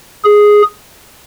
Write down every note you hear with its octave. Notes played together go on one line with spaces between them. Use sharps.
G#4